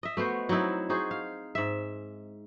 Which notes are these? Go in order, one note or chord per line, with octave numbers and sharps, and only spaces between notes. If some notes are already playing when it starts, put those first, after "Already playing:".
D#5 E5
A3 B3 F#4 C5
F#3 C4 D#4 E4
D#4 F#4 G#4 C5
F5
G#2 E5